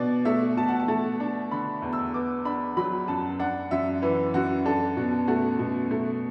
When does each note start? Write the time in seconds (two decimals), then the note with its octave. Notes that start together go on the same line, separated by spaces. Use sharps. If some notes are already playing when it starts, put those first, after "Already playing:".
Already playing: B2 D4 D5
0.25 A3 E5
0.57 B2 A5
0.68 F#5
0.80 A5
0.88 A3
1.20 D4
1.51 D3 B5
1.82 E2
1.93 E6
2.14 B3 D6
2.45 D4 B5
2.77 F#3 B5
3.08 F#2 A5
3.39 D4 F#5
3.71 F#2 E5
4.02 E3 B4
4.34 F#2 F#4
4.65 D4 A4
4.97 B2 F#4
5.27 A3 F#4
5.59 B2
5.91 A3